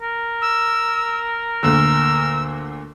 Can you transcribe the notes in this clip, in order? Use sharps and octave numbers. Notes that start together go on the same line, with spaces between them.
A#4
E6
D2 A#2 D3 E6